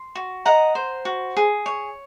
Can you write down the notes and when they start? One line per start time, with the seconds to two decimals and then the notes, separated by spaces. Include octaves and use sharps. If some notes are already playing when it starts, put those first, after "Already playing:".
Already playing: C6
0.15 F#4
0.45 D#5 F#5 A#5
0.75 C5
1.05 F#4
1.37 G#4
1.66 C#5